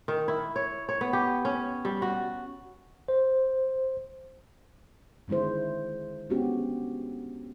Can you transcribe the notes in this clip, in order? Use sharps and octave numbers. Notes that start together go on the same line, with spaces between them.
D#3
E4
C#5
C#5
B3
G4
C#4
G3
F#4
C5
D3 D#3 G#3 E4 C5
G#3 B3 C#4 D4 F#4 G4